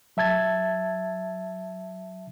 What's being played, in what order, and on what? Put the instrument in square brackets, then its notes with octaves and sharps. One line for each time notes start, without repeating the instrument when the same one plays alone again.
[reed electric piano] F#3 E5 A5 G#6 A6